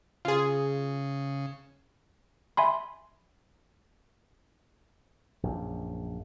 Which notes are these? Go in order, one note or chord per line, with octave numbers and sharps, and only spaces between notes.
C#3 F4 G#4
E5 G#5 B5 C6
A#1 F#2